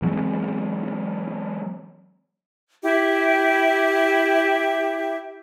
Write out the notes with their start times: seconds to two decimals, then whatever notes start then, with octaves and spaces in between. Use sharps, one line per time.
0.02 E3 F#3 G#3 C4
2.82 E4 G4 E5